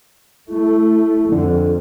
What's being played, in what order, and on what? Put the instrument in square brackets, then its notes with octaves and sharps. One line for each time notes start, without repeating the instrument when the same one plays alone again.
[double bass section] A3 [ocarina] E4
[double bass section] F2 [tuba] D3